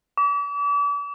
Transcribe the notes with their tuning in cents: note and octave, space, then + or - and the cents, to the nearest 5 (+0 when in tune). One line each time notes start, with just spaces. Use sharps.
D6 -40